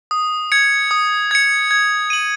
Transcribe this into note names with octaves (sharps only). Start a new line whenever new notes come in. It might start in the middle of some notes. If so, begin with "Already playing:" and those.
D#6
G#6 C#7
D#6
G#6 C#7
G#6
D#7 F#7